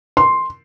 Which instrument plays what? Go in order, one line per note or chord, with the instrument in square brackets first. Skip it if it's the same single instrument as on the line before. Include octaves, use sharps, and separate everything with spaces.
[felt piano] C6